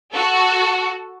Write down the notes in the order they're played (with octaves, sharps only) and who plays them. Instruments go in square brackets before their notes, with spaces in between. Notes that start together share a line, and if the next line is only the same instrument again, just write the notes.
[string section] F#4 A4